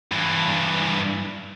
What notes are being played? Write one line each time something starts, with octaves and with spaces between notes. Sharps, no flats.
G2 E3